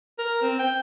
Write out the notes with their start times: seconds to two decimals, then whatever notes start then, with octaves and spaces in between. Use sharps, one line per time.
0.18 A#4
0.42 C4
0.59 G5